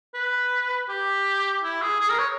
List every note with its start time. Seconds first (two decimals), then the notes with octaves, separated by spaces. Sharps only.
0.14 B4
0.89 G4
1.63 E4
1.82 G#4
2.00 G#4
2.10 A#4
2.19 C#5